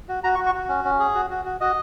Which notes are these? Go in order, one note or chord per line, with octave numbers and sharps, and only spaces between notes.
F#4
F#4 A#5
C#6
F#4
C#6
F#4
C#4
C#4
G#4
F#4
F#4
F#4
F#4 D#5